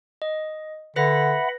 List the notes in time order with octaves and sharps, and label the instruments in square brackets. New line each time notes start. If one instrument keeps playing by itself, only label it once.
[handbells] D#5
[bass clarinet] D3 [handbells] B4 A#6 [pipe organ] E5 F#5 B5